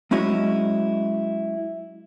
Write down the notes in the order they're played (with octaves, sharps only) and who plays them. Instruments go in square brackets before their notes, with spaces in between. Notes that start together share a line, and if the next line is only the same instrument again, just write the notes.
[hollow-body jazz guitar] F#3 G#3 C#4 E4 F#4 D#5